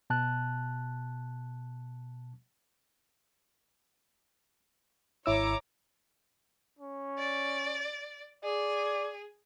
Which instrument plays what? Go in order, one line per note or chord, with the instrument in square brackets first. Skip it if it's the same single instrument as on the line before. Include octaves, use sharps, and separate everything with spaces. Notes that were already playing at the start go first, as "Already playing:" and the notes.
[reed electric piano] B2 A5 F#6
[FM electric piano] G#1 E4 E6 [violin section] C#5 A#5 D6
[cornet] C#4
[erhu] D5
[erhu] G#4 [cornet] D5